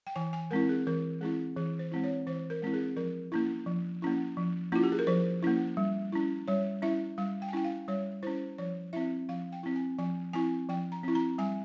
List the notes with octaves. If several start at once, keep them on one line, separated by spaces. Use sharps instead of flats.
G5
E3 G#5
G#5
G#3 C4 E4 A#4
G#4
E3 A#4
G#3 C4 E4 G#4
E3 G#4
C5
G#3 C4 E4
C#5
E3 C5
A#4
G#3 C4 E4
G#4
F3 A#4
A#3 C#4 E4
F3
A#3 C#4 E4
F3
A#3 C#4 E4 F4
G4
G#4
A#4
F3 C5
A#3 C#4 E4
G3
C#4 E4
G3 C#5
C#4 E4 E5
G3 F5
G5
G#5
C#4 E4 G5
F5
G3 C#5
C#4 E4 C5
F3 C#5
C4 E4 E5
F3 F5
G5
C4 E4
G#5
F3 G#5
C4 E4 G#5
F3 G5
A#5
C4 E4
A#5
G3 G#5